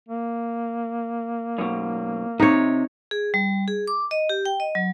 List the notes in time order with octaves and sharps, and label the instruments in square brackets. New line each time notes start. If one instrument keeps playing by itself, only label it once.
[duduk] A#3
[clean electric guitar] F#2 B2
[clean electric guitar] C3 [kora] D#4 C#5
[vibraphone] G#4
G3
G#4
D6
D#5
G4
G5
D#5
F#3